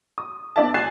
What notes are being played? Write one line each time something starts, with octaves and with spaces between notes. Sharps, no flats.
D#6
B3 D4 D5 E5 A5
G#5 F#6 A6 C7 E7